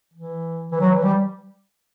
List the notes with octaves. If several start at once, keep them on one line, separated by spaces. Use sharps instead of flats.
E3
E3
F#3
E3
G3